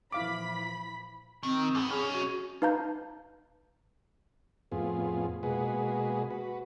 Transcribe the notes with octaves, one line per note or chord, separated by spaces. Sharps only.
A#2 E3 F3 E4 F5 B5 D6 B6
D#3 C4
G#2 B3
B1 C#4 G#4
F#4
D#4 B4 F5 A5 A#5 G6
F2 A2 B3 F4 G#4
B2 G#3 A#3 F#4 G#4 B4
F#4 B4